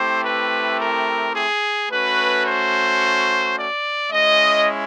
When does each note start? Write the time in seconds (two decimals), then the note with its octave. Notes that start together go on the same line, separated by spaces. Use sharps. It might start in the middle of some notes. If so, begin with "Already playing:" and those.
Already playing: A3 C4 E4 G4 C5
0.24 B4
0.79 A#4
1.34 G#4
1.89 A3 C#4 F#4 B4
2.45 C5
3.56 D5
4.10 G#3 C#4 E4 D#5